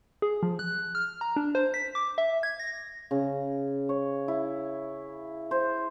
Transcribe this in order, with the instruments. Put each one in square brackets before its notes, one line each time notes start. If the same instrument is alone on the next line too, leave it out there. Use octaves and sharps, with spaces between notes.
[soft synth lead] G#4
F3
F#6
F6
A#5
D4
C5
B6
D6
E5
G#6
A#6
[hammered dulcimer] C#3
C#5
E4
C5